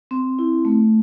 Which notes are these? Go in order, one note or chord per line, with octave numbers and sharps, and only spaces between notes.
C4
E4
A3